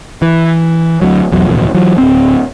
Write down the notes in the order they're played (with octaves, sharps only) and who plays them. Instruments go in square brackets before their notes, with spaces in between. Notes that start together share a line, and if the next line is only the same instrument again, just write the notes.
[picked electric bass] E3
D2 F#3
B1 E2 F#3
D1 A#1 E2 B2
E3 F#3
D1 C4